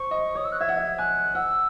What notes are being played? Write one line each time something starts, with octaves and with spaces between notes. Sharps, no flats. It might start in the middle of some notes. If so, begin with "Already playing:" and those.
Already playing: C5 C#6
D#5
C#5 D#6
E6
F#6
E5 G#6
F#5
E5
G#5 F#6
F#5 E6